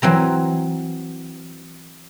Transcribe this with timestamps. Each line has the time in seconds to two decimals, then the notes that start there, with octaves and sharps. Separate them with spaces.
0.02 E3 F#3 C4 A#5